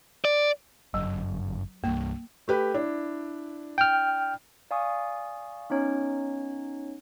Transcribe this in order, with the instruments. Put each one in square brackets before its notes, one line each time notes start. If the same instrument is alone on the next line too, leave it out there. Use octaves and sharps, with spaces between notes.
[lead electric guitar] D5
[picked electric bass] G1 F#2 [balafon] F#3
[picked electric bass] C2 G2 [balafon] A#3
[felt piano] A3 G4 B4
D4 E4
[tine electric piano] G5 F6
[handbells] D5 F5 G#5 C#6 D#6
B3 C#4 D#4 C#5